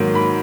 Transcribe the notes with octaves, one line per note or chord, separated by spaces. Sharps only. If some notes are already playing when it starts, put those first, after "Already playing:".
Already playing: G#2 D#3 F#3 A#3
B5